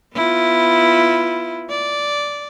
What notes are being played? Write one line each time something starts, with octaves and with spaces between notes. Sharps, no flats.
B3 E4 F4
D5